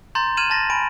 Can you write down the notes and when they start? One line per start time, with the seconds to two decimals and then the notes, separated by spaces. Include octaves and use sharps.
0.15 A#5 C6 G6 A6
0.37 F6 G#6 D#7 E7 F#7
0.50 A5 A6 A#6
0.70 G#5 B5 D7